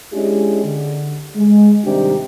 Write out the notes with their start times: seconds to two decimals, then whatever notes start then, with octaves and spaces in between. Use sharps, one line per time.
0.13 G#3 C#4 D4 E4 G4 G#4
0.64 D3
1.36 G#3
1.84 G#2 C3 D#3 G3 D4 G4